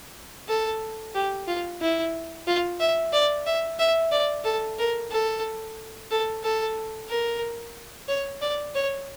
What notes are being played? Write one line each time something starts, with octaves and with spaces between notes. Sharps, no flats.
A4
G4
F4
E4
F4
E5
D5
E5
E5
D5
A4
A#4
A4
A4
A4
A#4
C#5
D5
C#5